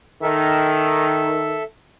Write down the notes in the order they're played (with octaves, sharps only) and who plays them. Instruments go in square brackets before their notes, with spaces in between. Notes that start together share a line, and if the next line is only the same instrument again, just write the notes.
[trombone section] D#3 [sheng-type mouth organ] A4 E5